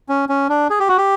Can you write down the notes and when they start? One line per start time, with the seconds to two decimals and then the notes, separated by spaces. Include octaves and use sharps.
0.09 C#4
0.29 C#4
0.49 D4
0.70 G#4
0.79 G4
0.88 F#4
0.97 G4